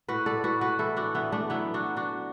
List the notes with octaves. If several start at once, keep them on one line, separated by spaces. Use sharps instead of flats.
A2 F#4 B4
A4 D5
A2 F#4 B4
F#4 B4
E3 E4 A4
D4 F#4
E3 B3 E4
A3 D4
F#3 B3 E4
D4 F#4
F#3
D4 F#4